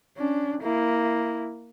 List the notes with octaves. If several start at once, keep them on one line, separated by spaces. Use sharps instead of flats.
C#4 D4
A#3 E4